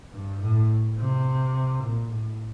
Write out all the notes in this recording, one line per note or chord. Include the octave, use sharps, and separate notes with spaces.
G2
A2
C3
A#2
A2